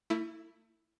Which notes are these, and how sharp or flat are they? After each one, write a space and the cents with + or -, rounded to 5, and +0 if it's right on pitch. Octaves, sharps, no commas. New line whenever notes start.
A3 +40 E4 +0